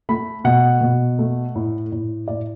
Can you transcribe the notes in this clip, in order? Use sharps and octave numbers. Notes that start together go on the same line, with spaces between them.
A3 B5
B2 F#5
B2
A3
A2
A2
A2 D5